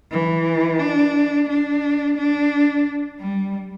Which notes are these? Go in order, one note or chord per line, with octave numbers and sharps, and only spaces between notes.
E3
D4
D4
D4
G3